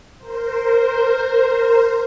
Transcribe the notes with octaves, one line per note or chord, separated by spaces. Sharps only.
A#4 C5